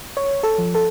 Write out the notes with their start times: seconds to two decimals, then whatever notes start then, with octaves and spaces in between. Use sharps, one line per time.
0.17 C#5
0.43 A4
0.58 F3
0.75 A4